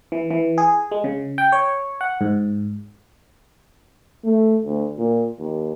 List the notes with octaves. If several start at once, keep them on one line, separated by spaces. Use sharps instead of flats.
E3
E3
G#4
G#3
C#3
G5
C#5
F#5
G#2
A3
D2
A#2
D#2